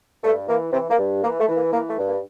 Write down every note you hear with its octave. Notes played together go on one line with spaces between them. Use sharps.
G2 A3
E3 A#3
C3 E3 C4
A#3
G2
E3 A#3
A3
E3
A#3
E3 A#3
A3
G2
A#3